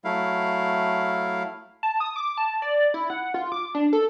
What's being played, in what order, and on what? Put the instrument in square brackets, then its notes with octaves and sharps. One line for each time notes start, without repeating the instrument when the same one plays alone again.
[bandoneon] F#3 A3 E4 F5
[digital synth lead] A5
D#6
D6
A5
D5
E4
F#5
F4
D6
D4
A4